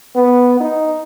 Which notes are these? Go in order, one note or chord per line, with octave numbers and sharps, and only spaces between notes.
B3
D#4